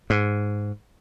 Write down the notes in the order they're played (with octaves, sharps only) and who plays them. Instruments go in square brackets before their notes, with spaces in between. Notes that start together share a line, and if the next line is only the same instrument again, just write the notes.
[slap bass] G#2